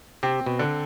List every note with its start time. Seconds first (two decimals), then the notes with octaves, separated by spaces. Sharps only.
0.23 C3 C4
0.46 B2
0.59 D3